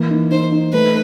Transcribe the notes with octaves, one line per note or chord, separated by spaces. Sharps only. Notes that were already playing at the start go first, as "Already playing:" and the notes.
Already playing: E3 A#3
D#4
D#4 C5
D#4
A3 B4